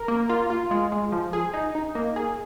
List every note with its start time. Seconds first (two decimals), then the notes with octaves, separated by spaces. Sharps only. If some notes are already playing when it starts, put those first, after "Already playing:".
Already playing: A#4
0.08 A#3
0.29 F4
0.50 F4
0.71 G#3
0.92 G#3
1.12 F3
1.33 G#4
1.54 D#4
1.75 D#4
1.95 A#3
2.16 G#4